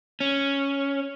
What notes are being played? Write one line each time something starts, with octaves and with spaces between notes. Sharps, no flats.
C#4